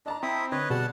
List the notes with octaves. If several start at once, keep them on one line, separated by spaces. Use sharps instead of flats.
D4 D#5 A5 A#5
C4 E4 E5 D#6
D3 B4 C#5 D#5
B2 G3 G#4 F#5 A5